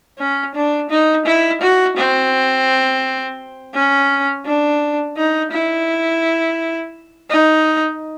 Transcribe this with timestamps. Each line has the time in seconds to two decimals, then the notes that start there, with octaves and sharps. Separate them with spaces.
0.19 C#4
0.55 D4
0.90 D#4
1.26 E4
1.61 F#4
1.97 C4
3.74 C#4
4.46 D4
5.17 D#4
5.52 E4
7.30 D#4